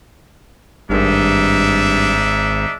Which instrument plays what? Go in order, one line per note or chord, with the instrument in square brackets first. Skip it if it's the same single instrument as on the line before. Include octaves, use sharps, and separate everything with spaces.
[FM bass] G#1 [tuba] G2 [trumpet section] D4 D#4 E5